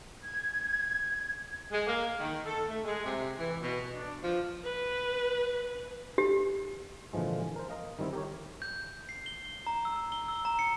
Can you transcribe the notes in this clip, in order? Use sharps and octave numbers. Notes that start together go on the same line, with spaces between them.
G#6
G#3
A#3
D#3
A4
A3
G#3
C3
E3
B2
D4
F3
B4
G4
A#2 D3 E3 F3 G#3
A#4 C5
A#4 D#5 F5
D#3 G3 C4 E4
G4 A#4 C#5
G6
C7
G7
A#5
E6
G7
E6
A#5
C#7